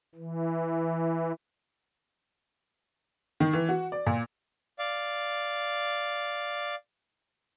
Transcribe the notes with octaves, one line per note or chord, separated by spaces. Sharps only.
E3
D#3
E3
F#4
D5
A#2
D5 F5